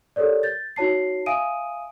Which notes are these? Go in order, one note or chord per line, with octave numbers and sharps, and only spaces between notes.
G4 A4 A#4 C#5 D5
G6 A6
D#4 F#4 C#5 A5 C7
E5 F5 G#5 D#6 D7 D#7